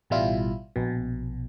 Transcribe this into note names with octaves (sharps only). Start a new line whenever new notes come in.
A1 B2 G3 E4 F4
A#1 B2